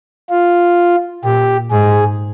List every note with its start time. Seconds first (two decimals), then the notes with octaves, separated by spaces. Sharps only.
0.29 F4
1.23 A#2 G4
1.71 G#2 G#4